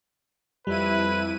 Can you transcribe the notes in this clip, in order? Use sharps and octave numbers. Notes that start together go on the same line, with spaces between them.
F2 G3 E4 B4 D#7